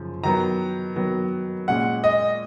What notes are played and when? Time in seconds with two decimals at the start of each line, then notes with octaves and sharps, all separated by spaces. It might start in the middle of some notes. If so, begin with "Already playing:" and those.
Already playing: F#2 C#3 F3
0.24 D#3 F#3 B3 A#5
0.96 D#3 F#3 B3
1.68 A#2 G#3 C#4 F#5
2.04 D#5